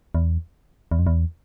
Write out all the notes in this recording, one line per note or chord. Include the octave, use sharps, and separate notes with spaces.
E2
E2
F2
E2